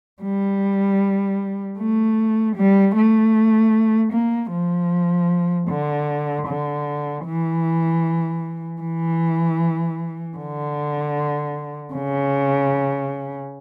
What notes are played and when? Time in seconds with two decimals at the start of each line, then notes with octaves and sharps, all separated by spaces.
0.22 G3
1.78 A3
2.56 G3
2.95 A3
4.13 A#3
4.52 F3
5.69 D3
6.47 D3
7.25 E3
8.82 E3
10.37 D3
11.94 C#3